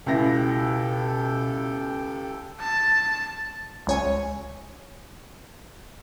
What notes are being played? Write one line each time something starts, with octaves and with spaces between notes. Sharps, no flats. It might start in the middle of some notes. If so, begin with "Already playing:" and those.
C#2 B2 E4 G4 A4 G5 A#6
A5
C#2 C#5 G#5